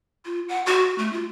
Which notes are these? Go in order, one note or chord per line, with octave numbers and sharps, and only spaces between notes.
F4
F#5
F#4
A3
F4